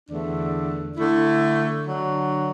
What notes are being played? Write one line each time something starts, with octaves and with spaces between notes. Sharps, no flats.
E2 D3 A3 D4
D3 A3 E4
D3 F#3 D4